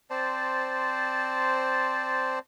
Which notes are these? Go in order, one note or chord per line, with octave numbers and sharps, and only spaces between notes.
C4 C5 D5 A5